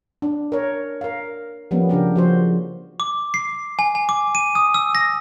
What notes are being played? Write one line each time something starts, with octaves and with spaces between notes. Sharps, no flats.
D4
A#4 C#5
A#4 F5
F3 G3 A#3 B3 C#4
C#3 D4 G4 A#4
F3 F#4 C5
D6
C7
G#5
G#5
D6
D#7
D#6
E6
A#6